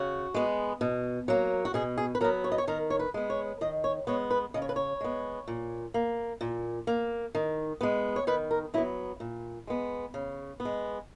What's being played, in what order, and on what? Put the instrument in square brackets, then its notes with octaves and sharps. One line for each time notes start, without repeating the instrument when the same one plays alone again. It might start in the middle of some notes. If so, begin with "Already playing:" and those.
Already playing: [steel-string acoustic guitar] C#3 F#4
G#3 B3
B2
F#3 A#3
F#4
B2 G#4
G#4
B4
F#3 A#4
B3
C#5
D#5
C#5
D#3 A#4
C#5
B4
G#3 B3
C#5
D#3 D#5
C#5
G#3 B3 C#5
B4
C#3 D#5
C#5
B4
C#5
G#3 B3
A#2
A#3
A#2
A#3
D#3
G#3 B3
C#5
D#3 B4
A#4
F#3 E4
B3
A#2
G#3 B3
C#3
B3
G#3